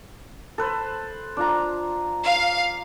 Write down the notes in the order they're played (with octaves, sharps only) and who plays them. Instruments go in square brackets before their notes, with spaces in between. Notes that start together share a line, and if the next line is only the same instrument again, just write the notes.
[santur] A4 B4 C5
D4 F4 A#5
[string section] F5